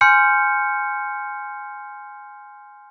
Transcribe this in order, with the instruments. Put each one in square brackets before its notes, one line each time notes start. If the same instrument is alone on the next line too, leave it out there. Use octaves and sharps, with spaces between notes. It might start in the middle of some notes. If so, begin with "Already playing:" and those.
[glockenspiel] G#5 C6 F6 G6 C#7